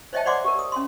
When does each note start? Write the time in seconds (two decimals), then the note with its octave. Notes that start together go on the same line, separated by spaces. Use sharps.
0.13 C5 C#5 D#5 E5 G5 A5
0.26 C5 D5 F#5 C6 D6
0.44 G4 A#4
0.59 D#6
0.72 C#4 C6